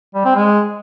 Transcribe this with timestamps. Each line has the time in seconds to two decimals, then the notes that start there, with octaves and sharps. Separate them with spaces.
0.15 G3
0.25 C4
0.35 G#3